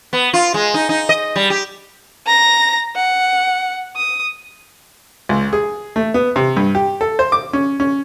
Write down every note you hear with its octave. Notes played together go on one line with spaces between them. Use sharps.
B3
F4
G#3
D#4
D#4
D#5
G3
G4
A#5 A#6
F#5
D#6
C#2
G#4
A3
B3
C3
G2
G4
A4
C5
D6
C#4
C#4